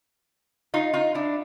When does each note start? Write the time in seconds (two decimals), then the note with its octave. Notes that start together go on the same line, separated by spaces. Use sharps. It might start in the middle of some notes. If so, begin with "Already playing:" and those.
0.74 D#4 F4
0.94 D#4 F4
1.14 D4 E4